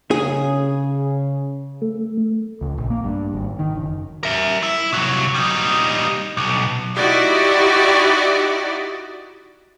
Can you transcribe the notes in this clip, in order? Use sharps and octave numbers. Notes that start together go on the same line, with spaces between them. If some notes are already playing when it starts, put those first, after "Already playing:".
C#3 G#4
A3
C#2
A#1
A#3
G2
G#1
D#3
F#1
A#4 E5
E4
C2 F#3
G3 D#4
B1
D#4 E4 F#4 G4 D5 D#5